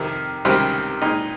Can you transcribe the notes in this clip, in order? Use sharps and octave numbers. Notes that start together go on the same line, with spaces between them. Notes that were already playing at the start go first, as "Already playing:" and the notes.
Already playing: F2 C3 D#3
C#2 C3 D#3 G3 C4
A#2 G#3 D#4 G4